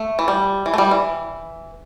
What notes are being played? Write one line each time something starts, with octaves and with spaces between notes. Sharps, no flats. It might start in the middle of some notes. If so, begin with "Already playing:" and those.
Already playing: A3
E3
G3
E3
A3
G3
E3